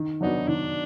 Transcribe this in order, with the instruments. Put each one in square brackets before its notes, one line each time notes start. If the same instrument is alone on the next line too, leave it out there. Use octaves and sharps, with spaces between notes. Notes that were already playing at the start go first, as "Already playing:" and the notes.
Already playing: [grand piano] D#3
[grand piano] F#3 B3 D4 F#4 [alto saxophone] D#4
[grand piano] D#3 [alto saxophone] D4